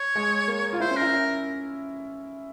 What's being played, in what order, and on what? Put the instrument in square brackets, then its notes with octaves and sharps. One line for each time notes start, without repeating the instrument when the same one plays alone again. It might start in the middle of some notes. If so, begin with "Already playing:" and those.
Already playing: [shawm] C#5
[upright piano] G#3
A#3
F4
[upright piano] E4 [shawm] C5
[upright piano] C#4
[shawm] A#4
[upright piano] E4
C#4